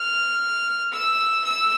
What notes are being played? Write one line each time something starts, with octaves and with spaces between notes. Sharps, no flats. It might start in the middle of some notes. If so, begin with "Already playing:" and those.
Already playing: F6
E6
E6